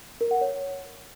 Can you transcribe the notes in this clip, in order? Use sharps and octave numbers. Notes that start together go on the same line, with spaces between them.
A#4
F#5
C#5